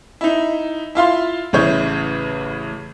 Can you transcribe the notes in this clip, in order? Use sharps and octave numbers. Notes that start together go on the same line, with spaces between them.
D#4 E4
E4 F4 F5 C6
A1 C#3 E4 C#5 G6